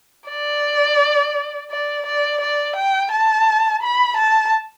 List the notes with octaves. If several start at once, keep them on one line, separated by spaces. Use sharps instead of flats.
D5
D5
D5
D5
G5
A5
B5
A5